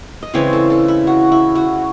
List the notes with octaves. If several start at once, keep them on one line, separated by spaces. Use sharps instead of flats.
D#5
C#3 E3 G#3 C4 C#5
A4
A4
E4
F#4
E4
F#4